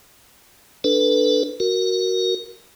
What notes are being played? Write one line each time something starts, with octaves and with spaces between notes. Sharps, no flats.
D4 A4 B4
F#4 A#4